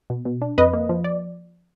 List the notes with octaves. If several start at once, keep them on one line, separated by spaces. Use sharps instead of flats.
B2
B2
D4
F2 B4 D#5
A#3
F3
D5